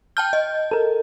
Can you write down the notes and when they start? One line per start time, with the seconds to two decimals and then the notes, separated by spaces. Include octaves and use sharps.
0.17 G5 A5 F6 G6
0.33 D#5
0.71 A4 A#4